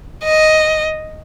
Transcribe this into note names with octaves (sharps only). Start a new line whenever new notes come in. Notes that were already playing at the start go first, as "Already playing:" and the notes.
D#5